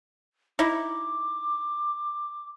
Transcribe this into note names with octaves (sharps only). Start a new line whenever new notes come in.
D#4 E4 D6